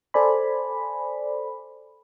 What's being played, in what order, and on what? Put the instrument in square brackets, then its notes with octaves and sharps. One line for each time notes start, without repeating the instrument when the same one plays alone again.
[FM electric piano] A4 C5 D5 G#5 B5